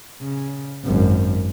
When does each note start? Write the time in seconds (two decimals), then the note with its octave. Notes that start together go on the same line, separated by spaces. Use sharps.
0.22 C#3
0.84 G#1 F#2